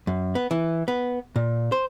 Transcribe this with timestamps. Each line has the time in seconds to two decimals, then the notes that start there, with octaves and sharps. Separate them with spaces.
0.07 F#2
0.35 B3
0.51 E3
0.88 B3
1.36 A#2
1.72 C5